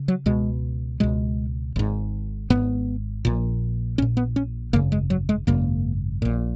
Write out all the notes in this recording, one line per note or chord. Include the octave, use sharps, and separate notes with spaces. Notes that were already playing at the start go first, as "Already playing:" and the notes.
Already playing: C#3
F#3
C#2 B2 G#3
C#2 B2 G#3
G#1 G#2
G#1 G#2 B3
A#1 A#2
A#1 A#2 C#4
B3
C#4
G#1 F#2 C#3 A#3
G#3
F#3
G#3
G#1 F#2 C#3 A#3
A#1 A#2